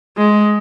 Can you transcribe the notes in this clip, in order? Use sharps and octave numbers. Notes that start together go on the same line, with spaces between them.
G#3